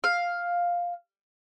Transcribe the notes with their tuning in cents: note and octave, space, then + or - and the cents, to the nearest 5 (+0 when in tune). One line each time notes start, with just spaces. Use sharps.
F5 +5